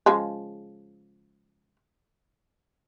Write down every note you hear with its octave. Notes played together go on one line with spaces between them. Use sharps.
C#3 F3 G#3